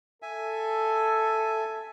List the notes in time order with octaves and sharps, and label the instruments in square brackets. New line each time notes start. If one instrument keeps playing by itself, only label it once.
[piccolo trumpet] A4 [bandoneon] E5 G#5